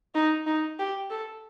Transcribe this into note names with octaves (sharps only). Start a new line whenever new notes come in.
D#4
D#4
G4
A4